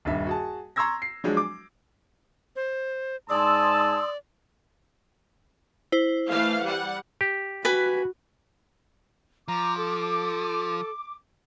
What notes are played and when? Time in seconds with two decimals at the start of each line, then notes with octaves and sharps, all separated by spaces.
0.05 D#1 G2 E5
0.27 F#4 G#4 A5
0.76 A#5 C6 C#6 E6 G#6 A#6
1.02 C7
1.24 F3 F#3 G#3 D4
1.37 D6
2.56 C5
3.30 G#2 D5 G#5 A5 C6 D#6 E6
5.92 E4 C5
6.29 E3 A3 F5
6.63 G3 F#5
7.21 G4
7.65 F#4 B4 G#5 B5
9.48 F3 A#5 D6
9.77 A4